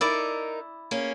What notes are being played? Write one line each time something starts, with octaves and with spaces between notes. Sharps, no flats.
D#4 E4 A#4 D5 A5
A#3 C#4 G#4